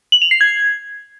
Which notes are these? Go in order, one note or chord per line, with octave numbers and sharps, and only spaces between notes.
F#7
F7
C7
G#6